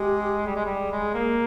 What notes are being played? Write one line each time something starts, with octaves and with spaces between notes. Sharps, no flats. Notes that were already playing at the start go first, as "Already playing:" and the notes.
Already playing: G#3 G4
G3 G#4
G#3
G3
G#3
A#3